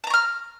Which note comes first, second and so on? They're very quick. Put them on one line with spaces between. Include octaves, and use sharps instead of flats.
A5 A#5 C#6 F6